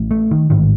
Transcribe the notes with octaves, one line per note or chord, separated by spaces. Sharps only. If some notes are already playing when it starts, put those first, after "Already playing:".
Already playing: A1 A2
A3
D#3
A1 G#2 D#3